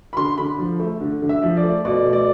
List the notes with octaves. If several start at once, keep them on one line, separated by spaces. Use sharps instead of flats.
B5
D3 C6
D3 B5
F3
A3
D3
D3
E5
F3
D5
A3
B2 D5
A3
D5